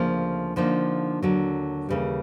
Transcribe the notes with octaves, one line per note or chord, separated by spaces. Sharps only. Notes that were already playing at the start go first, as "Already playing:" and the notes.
Already playing: D2 C#3 F3 A#3
D3 F3 A#3 D#4
D#2 D3 F#3
D#2 C#3 E3 G3